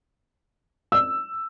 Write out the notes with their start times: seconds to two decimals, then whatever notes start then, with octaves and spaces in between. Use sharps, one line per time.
0.92 E6